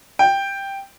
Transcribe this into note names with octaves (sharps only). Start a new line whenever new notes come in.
G5